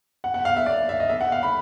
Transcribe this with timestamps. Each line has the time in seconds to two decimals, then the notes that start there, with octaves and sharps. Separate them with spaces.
0.24 F#5
0.34 F#5
0.45 F5
0.56 E5
0.66 D5
0.89 E5
1.00 D#5
1.09 E5
1.21 F#5
1.32 F5
1.43 B5